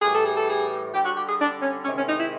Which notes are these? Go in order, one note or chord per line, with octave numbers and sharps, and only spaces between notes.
A2 E3 G3 G#4
A4
G#4
A4
G#4
D3 G3 G4
F#4
G4
G#4
D4
C#4
C3 D#3 G#3 C#4
C#4
D#4
E4